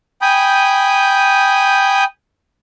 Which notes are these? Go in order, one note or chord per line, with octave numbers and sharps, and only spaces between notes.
G5 G#5 B5 D#6 G6